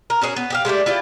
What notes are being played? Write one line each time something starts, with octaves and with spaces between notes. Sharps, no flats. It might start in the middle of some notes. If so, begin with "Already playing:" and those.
A#4
C#4 F#4 G#4 C#5
B3
G4 G#4 F5
G#3 A3 G4 D5
E4 F4 G4 D5